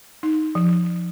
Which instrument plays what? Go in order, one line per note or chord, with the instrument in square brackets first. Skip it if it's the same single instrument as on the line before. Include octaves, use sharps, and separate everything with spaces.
[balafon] D#4
F3